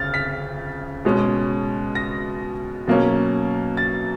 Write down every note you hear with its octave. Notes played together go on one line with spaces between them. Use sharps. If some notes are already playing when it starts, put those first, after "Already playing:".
Already playing: D2 C#3 F6 A6
B6
B2 G#3 C#4
A#6
B2 F#3 A#3 C#4
A6